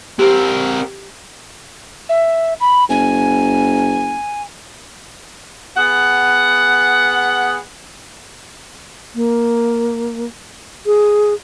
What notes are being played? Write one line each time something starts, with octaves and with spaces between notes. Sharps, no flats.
C4 G4 A#4
E5
B5
F#1 G#5
B3 G#4 F#5
A#3
G#4